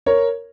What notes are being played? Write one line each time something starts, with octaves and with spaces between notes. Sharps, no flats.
A#4 C#5